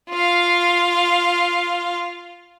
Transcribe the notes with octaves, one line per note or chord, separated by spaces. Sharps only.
F4 F5